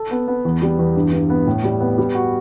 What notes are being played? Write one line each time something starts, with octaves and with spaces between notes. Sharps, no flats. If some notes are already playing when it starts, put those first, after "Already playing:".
Already playing: A4
B3
B3
E2
G3
E2
G2
G2
B3
A2
G3
B3
G3
F#4